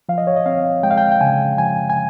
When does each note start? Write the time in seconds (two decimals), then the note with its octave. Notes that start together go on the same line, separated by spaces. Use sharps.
0.09 F3 F5
0.18 D#5
0.27 C#5
0.36 D#5
0.46 C4 F5
0.83 G#3 G5
0.91 F5
0.98 G5
1.12 G5
1.21 C#3 G#5
1.58 F3 G#5
1.90 G#5